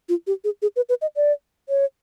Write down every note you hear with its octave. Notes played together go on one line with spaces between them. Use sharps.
F4
G4
G#4
G#4
B4
B4
D#5
D5
C#5